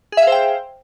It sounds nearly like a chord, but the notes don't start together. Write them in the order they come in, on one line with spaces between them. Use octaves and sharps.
G#4 E5 F5 C5 G5